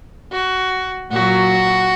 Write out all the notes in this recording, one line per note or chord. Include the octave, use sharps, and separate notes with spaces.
F#4
A#2 F#3 F#4